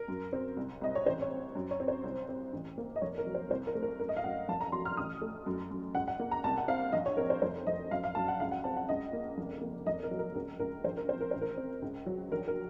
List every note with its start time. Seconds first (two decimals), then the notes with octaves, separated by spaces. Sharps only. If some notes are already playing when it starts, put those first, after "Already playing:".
Already playing: A#4
0.08 F#2
0.33 C4
0.57 C2
0.81 C2 D#5
0.95 C#5
1.06 A1 C5
1.22 C#5
1.30 C4
1.55 F#2
1.71 C#5
1.80 C4
1.88 C5
2.04 C2
2.29 C4
2.53 A1
2.78 A#3
2.96 D#5
3.01 F1 C#5
3.18 A#4
3.26 F#3
3.34 C5
3.50 C2 C5
3.67 A#4
3.75 A3
3.83 A#4
3.99 F#2 A#4
4.09 D#5
4.17 F5
4.24 F#2 F#5
4.49 F1 A5
4.61 A#5
4.72 F#3 C6
4.85 F6
4.97 A1 D#6
5.22 A3
5.46 F#2
5.71 F#2
5.95 C#2 F#5
6.08 F#5
6.20 A#3
6.31 A#5
6.44 C2 A5
6.58 F#5
6.68 C4 F5
6.92 A#1 D#5
7.06 C#5
7.17 C4 A#4
7.30 C5
7.42 F1 C5
7.67 F1 D#5
7.91 F#2 F5
8.04 F5
8.15 F#2 A5
8.28 F#5
8.40 C#2 F5
8.51 F#5
8.64 C4 A5
8.77 F#5
8.89 C#2 D#5
9.13 A#3
9.38 F1
9.62 A#3
9.86 F1 D#5
10.03 A#4
10.11 F#3
10.19 A#4
10.35 C#2 A#4
10.59 C#2 A#4
10.84 A#1 C5
10.97 A#4
11.09 C4 C5
11.21 A#4
11.31 A1 C5
11.41 A#4
11.57 C4
11.82 C#2
12.06 F#3
12.31 A#1 A#4
12.48 A#4